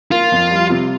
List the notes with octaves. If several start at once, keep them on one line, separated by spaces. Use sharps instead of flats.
A#3 F4
F2
G3
C3